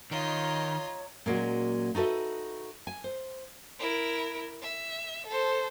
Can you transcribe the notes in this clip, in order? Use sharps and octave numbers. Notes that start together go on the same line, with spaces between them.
D#3 F4 C#5 D#5 A#5
A#2 F#3 G#3 A#3 C#4 F#4
D#4 F#4 A4 B4 E5
G#5
C5
E4 A#4
E5
A4 C5